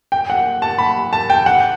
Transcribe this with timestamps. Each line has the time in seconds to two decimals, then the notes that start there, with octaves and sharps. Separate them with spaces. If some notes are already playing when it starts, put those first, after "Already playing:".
0.12 G5
0.30 F#5
0.62 A5
0.78 B5
1.13 A5
1.30 G5
1.46 F#5